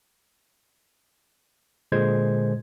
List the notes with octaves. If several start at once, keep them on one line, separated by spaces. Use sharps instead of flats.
A#2 D3 G#3 C5 G#6